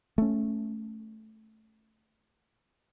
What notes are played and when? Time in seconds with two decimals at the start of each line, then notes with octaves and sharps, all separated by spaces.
0.18 A3 C#4